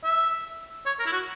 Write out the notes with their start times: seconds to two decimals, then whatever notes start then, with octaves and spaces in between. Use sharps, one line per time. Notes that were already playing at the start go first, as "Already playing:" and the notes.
0.04 E5
0.86 C#5
0.99 A#4
1.06 E4
1.12 F#4